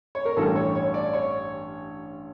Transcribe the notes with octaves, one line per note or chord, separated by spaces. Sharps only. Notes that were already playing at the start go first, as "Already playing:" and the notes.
C#5
A#4
A1 G2 E3 G3 A4
C#5
C#5
D5
C#5